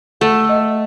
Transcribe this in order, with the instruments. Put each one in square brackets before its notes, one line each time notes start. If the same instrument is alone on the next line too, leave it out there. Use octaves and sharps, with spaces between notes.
[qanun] A3 [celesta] F#5
[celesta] D#5